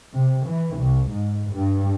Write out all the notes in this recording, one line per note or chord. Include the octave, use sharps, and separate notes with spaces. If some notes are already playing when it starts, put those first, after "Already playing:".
C3
E3
C2
G#2
G2